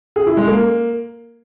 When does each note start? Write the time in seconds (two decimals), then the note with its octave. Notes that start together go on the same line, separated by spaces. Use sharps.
0.16 G#4
0.27 E4
0.37 G#3
0.48 A#3